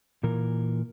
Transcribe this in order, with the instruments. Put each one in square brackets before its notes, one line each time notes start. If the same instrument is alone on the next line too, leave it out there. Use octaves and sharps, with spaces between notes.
[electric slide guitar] A#2 E3 A#4